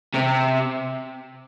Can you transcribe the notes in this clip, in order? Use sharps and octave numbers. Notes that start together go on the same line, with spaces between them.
C3